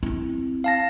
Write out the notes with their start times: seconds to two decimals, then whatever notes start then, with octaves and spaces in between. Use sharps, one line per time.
0.03 C4 E4
0.64 F5 A5 A#6